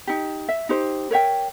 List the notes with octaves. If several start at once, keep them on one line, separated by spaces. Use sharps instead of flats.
D#4 G4
E5
D#4 G4 C5
A#4 C#5 E5 G5